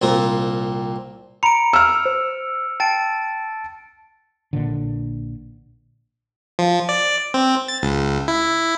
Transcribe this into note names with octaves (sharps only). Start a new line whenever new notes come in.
C2 A#2 C4 F4 A#4
A#5 B5 C#7 D7 F7
E6 F6
C5
G5 A5 A6 D7
A#1 A#2 D3
F3
D5
C4
A6
C#2
E4